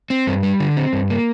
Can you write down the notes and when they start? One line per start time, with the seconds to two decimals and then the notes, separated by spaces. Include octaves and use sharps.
0.10 C4
0.27 G2
0.43 G3
0.60 D3
0.77 C4
0.93 G2
1.10 A#3